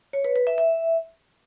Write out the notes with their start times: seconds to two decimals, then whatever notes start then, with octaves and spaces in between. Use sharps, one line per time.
0.13 C#5
0.24 B4
0.36 B4
0.47 E5
0.58 E5